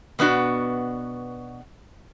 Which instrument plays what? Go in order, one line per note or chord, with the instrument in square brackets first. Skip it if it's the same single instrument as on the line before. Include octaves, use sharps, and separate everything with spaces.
[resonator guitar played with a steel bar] B2 B3 D4 F#4